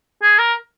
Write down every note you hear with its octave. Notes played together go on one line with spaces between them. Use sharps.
G#4
A#4